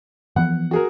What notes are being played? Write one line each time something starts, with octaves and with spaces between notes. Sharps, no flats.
E3 F3 B3 F#5
F#4 G#4 A#4